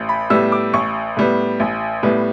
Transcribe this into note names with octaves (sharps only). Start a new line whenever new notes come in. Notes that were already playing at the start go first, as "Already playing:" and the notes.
Already playing: A1
B5
A2 G3 B3 E6
D6
A1 C#6
A2 G3 B3
A1
A2 G3 B3